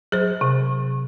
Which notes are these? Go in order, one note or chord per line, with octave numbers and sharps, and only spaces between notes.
F#3 G#4 C5
C3